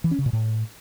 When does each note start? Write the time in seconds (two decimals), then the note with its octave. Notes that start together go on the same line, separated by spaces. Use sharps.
0.04 E3
0.11 C#4
0.19 C#3
0.26 A#2
0.33 A2